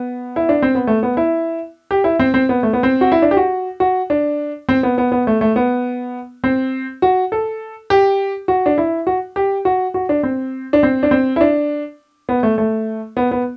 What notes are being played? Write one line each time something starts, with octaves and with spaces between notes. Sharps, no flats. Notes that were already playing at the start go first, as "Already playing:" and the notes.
Already playing: B3
E4
D4
C4
B3
A3
B3
E4
G4
E4
C4
C4
B3
A3
B3
C4
F#4
E4
D4
G4
F#4
F#4
D4
C4
B3
B3
B3
A3
A3
B3
C4
F#4
A4
G4
F#4
D4
E4
F#4
G4
F#4
F#4
D4
C4
D4
C4
D4
C4
E4
D4
B3
A3
A3
B3
B3